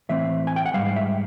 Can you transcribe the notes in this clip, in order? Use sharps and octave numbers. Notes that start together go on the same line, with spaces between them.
A2 E3 A3 C4 E5
G#5
G5
F#5
G#2 E3 G3 F5
E5